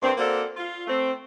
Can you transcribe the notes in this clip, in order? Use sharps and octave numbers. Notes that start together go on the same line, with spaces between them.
G2 A#3 C4
A#3 C4 D4 F#4 A4
F4
A3 C4